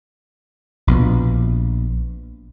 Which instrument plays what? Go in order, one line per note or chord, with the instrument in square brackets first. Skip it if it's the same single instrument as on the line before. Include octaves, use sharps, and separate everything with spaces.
[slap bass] A#1 B2